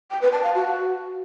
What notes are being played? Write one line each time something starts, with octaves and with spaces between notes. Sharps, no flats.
G5
B4
A5
F5
F#4